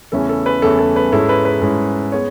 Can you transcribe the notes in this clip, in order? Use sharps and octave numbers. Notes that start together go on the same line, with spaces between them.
E2 C#3 E3 A3 C#4 A4
A4
B4
E2 C#3 E3 A3 C#4 A4
A4
B4
G#2 G#3 C#4 E4 A4
B4
B4
G#2 G#3 C#4 E4
G#3 B3 C#5